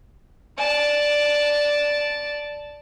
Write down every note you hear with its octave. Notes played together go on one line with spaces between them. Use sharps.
D5 A5